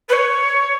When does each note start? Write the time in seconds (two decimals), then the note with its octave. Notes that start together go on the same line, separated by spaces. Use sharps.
0.08 B4
0.12 C#5